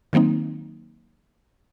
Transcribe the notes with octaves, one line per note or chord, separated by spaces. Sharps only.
D#3 F#3 A#3 C4 D#4